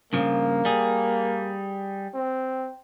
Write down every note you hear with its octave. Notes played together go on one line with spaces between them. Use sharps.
G2 C#3 F3 A#3
G3 G#4
C4